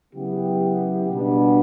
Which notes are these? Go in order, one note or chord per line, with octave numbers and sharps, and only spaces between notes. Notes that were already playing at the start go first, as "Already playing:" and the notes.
C#3 F#3 B3 E4 G4
B2 G3 B3 D4